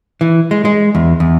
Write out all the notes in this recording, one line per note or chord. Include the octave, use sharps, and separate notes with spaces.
E3
G#3
G#3
E2
E2